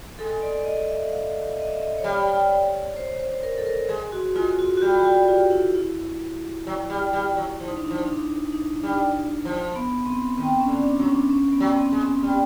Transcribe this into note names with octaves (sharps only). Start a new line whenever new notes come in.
G#3 A4
D5
D#5
E5
F5
D#5
E5
D#5
C#5
G3 D5
C5
C5
A#4
A4
A#4
G#3 G#4
F#4
G#3 F4
F#4
F#4
G3 G4
G4
F#4
F4
E4
E4
F#3
G3
G3
F#3
F3 E4
D#4
D4
D#4
F3
D4
D#4
G3 D4
F3
B3
C4
D#3 C4
C#4
D3
D4
F#3 C#4
D4
C#4
B3
F#3
C4
G#3
C#4
G3